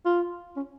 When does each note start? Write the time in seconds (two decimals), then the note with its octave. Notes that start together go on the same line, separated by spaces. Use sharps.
0.05 F4
0.56 C#4